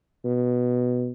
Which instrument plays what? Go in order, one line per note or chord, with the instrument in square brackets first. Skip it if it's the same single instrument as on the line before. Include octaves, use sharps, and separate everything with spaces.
[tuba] B2